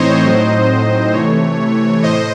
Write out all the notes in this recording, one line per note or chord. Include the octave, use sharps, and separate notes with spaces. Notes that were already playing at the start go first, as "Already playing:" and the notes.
Already playing: A2 E3 C4 D#4 C5 C#5 D#5
A2 F#3 C4 D#4
C3 E3 A3 C#5
A2 C5 D#5